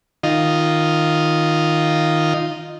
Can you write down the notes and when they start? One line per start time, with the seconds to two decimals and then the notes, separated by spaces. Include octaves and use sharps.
0.23 D#3 F4 D#5